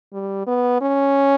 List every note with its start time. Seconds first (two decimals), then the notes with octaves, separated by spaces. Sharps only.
0.13 G3
0.47 B3
0.81 C#4